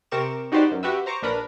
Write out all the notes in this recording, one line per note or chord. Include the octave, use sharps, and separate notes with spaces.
C3 C4 A#4 C#6 D6 E7
D#4 F#4 G4 B4 C5 D5
F#2
F#4 G4 B4 E5
C5 A#5 C#6 D6
A#1 D4 A#4 B4 A#5 B5